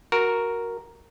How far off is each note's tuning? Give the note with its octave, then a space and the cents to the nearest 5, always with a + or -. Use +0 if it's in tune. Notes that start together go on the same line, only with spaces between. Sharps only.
F#4 +0 A#4 +5